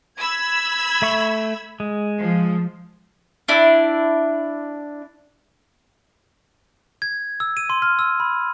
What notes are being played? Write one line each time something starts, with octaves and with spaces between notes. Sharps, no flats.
B5 E6 G#6
A3 E5 C#6
G#3
F3
D4 E4
G#6
E6
D#7
C6
F6
E6
B5